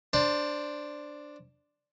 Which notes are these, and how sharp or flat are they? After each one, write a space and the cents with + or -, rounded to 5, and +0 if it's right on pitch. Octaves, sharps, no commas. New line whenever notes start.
D4 +0 C5 +0 A5 +25